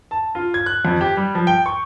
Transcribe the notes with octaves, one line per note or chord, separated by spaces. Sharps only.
A5
F4
G#6
F#6
F2
G4
G3
F3
G5
C#6